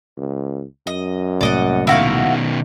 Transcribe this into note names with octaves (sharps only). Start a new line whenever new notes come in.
C#2
F#2 D#5
C2 A2 A#3 D5 D#5 F#5
B2 D#3 E4 F#4 F5